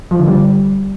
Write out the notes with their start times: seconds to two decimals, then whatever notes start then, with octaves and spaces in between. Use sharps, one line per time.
0.11 F3
0.19 D3
0.28 G3